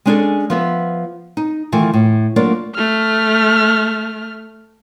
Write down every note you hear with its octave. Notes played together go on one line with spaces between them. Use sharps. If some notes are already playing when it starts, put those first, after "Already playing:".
G#3 C#4 D4 F#4 G#4 A4
F3 B3 E5
D#4
D#3 E3 A3 F4
A2
F#3 A3 A#3 D4 F4 D5
A3 F6